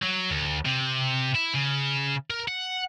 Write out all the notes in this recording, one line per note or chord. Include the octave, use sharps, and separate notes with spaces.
F#3
D2
C3
E4
C#3
A#4
F#5